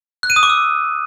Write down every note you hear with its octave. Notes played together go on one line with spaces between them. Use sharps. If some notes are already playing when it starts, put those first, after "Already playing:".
F#6
D#7
D#6
D6
E6